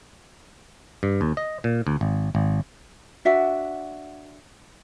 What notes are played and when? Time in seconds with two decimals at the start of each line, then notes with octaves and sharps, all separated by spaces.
1.03 G2
1.21 D#2
1.37 D#5
1.64 A#2
1.87 D2
2.01 G#1
2.35 G#1
3.25 D4 F#4 E5 F#5